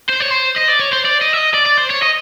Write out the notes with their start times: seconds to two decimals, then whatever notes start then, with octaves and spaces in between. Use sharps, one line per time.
0.09 C5
0.20 C#5
0.31 C5
0.58 D#5
0.70 D5
0.81 C#5
0.93 C5
1.06 D5
1.22 D#5
1.34 E5
1.38 D#5
1.54 D5
1.66 D5
1.77 C5
1.90 C#5
2.02 D#5